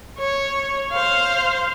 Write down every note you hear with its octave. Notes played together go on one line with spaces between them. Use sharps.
C#5
C5 F5